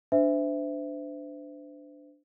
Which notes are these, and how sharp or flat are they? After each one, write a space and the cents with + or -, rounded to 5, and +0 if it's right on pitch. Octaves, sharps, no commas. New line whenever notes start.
D4 +0 C5 -30 E5 +0